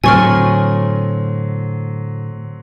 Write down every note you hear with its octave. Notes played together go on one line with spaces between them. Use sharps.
A2 D3 F#3 C4 G#5 C#6 F6